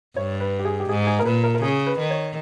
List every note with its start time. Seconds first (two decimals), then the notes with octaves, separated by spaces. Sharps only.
0.16 G2 C#5
0.40 B4
0.59 G4
0.65 G#4
0.80 G4
0.89 G#2 G#4
1.07 G#4
1.19 A#4
1.25 A#2 B4
1.44 A#4
1.54 A#4
1.62 C#3 G#4
1.87 B4
1.98 D#3
2.10 C#5